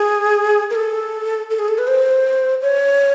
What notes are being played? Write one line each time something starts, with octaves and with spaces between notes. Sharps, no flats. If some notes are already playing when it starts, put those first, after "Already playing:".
Already playing: G#4
A#4
A4
A4
G#4
A4
B4
C5
C#5